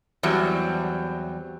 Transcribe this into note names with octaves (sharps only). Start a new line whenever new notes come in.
E2 F#3 G3 C4